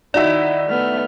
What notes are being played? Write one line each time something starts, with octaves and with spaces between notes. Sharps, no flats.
D#3 D#4 E4 F#4 D5 E5
A3 B3 F6